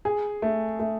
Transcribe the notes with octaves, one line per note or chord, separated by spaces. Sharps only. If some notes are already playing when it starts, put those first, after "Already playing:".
G#4
A3
A3